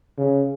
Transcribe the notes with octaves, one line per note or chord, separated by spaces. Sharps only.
C#3